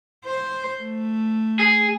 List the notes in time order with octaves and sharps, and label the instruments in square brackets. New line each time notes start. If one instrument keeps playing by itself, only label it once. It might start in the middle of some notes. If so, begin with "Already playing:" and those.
[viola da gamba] C5
A3
[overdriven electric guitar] G#4